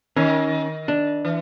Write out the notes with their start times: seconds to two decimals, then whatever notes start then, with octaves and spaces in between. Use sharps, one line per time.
0.16 D#3 C#4
0.88 D4
1.25 E3